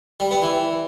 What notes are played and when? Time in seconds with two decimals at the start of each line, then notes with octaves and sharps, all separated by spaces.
0.20 G3
0.31 B3
0.42 E3